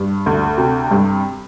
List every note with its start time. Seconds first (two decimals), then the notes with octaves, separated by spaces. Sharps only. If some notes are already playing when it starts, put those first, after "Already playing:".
Already playing: G2
0.26 D2
0.58 C3
0.91 G2